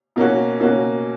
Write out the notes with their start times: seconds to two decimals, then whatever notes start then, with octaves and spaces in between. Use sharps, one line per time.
0.16 B2 A#3 C#4 F#4
0.60 B2 A#3 C#4 F#4